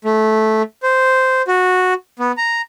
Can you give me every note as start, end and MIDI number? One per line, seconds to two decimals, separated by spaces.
0.05 0.62 57
0.83 1.42 72
1.48 1.94 66
2.19 2.32 59
2.37 2.61 82